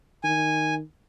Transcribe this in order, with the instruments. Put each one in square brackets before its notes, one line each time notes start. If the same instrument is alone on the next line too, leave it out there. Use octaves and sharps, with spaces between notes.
[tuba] D#3 [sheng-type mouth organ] G#5